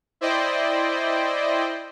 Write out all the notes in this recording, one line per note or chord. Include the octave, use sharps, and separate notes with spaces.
E4 C5 D5 D#5 G5